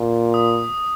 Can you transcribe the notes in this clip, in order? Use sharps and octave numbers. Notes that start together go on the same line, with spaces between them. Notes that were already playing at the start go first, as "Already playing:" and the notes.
Already playing: A#2
D#6